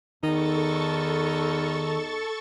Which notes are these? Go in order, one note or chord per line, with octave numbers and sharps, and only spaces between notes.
E2 D#3 D#4 A4 C#6 A6